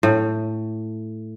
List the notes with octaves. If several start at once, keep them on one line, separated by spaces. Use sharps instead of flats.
A2